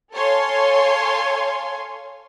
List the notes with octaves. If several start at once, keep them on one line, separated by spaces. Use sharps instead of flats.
A4 C#5 F5 G#5 C6